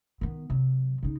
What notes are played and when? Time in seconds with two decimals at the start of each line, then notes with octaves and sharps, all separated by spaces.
0.21 D#3 B3
0.50 C3 F#3
1.03 C#3 D#4